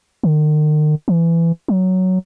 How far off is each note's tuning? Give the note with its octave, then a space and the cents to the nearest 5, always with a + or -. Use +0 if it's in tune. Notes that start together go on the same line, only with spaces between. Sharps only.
D#3 -40
E3 +20
F#3 +5